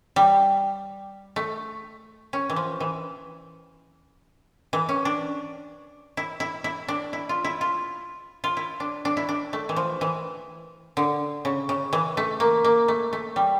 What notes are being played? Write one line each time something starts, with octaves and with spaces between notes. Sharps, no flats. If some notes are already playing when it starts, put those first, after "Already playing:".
G3
A3
C#4
E3
F3
E3
E3
C#4
D4
E4
E4
E4
D4
E4
F4
E4
F4
F4
E4
D4
D4
E4
D4
A3
E3
F3
E3
D3
C#3
C#3
E3
A3
A#3
A#3
A3
A3
G3